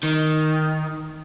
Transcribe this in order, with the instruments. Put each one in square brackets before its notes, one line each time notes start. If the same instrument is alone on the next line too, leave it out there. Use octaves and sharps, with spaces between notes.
[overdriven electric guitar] D#3